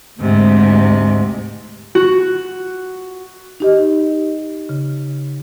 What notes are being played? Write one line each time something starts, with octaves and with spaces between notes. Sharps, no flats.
D2 G#2 C3
F#4
D#4 G4 D#5
C#3